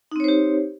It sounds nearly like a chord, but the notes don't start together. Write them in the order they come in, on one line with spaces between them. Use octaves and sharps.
D#4 C4 C#5 C5 G4